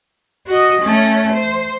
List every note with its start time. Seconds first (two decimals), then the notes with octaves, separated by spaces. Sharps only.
0.47 F#4 D#5
0.81 A3 C#4
1.32 C5